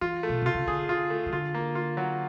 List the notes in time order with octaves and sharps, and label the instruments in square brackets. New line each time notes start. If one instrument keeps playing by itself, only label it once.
[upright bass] E3 [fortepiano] F4
[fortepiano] A3
[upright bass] B2
[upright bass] C3 [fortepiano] F4
[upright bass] C#3
[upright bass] D3 [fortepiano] G#4
[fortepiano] F4
A3
[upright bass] D#3
[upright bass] D3 [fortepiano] F4
[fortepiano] A#3
F4
F#3